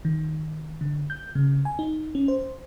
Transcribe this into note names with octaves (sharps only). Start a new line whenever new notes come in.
D#3
D3
G6
C#3
G#5
D#4
C#4
C5